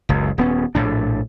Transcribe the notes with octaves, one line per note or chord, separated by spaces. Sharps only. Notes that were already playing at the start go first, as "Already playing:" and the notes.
F#1 C#2
D#1 B3 C#4
A#1 A2 D4